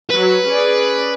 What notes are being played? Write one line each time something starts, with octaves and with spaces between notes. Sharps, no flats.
F#3 F#4 B4
C#4 G#4 D5